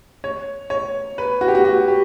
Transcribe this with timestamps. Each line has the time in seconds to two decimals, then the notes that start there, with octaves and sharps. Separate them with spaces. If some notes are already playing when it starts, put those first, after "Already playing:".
0.24 C#5
0.70 C#5
1.18 B4
1.41 F#4
1.48 G4
1.55 F#4
1.65 F#4
1.88 G4